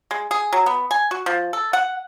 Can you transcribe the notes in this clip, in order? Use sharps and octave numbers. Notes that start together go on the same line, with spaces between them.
G#3
G#4
F#3
B3
G#5
F#4
F3
A4
F#5